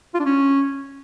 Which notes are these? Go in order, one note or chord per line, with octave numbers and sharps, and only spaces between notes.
F4
D4
C#4